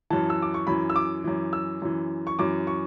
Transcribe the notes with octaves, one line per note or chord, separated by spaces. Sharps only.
F#2 E3 A5
E6
D6
C#6
F#2 E3 B5
E6
D6
F#2 E3
E6
F#2 E3
C#6
F#2 E3 D6
C#6